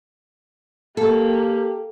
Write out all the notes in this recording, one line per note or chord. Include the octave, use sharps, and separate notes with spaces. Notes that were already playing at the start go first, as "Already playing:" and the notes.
A#3 G4 A4